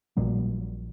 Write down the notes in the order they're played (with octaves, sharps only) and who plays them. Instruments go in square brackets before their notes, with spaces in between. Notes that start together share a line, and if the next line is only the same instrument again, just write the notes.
[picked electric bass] A#1 A#2 F#3 G3